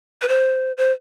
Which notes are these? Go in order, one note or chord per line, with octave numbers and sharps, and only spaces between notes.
B4
C5
C5